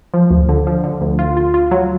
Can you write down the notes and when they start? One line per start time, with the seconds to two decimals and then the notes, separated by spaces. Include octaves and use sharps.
0.14 F3
0.31 D2
0.49 D3
0.67 F3
0.84 D3
1.01 D2
1.19 F4
1.37 F4
1.54 F4
1.71 F#3